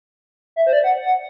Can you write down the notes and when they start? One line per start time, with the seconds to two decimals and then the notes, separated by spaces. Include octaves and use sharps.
0.56 E5
0.67 C5
0.73 D5
0.84 F#5
1.05 F#5